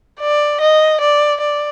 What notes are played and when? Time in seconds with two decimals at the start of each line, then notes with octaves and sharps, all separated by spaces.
0.21 D5
0.61 D#5
1.01 D5
1.41 D5